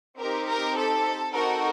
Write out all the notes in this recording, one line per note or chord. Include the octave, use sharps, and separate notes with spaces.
C4 D#4 G4 A#4
A#4
A4
C4 D#4 F#4 A4 A#4